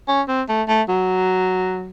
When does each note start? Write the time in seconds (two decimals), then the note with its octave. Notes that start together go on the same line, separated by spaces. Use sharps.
0.08 C#4
0.28 C4
0.48 A3
0.68 A3
0.89 F#3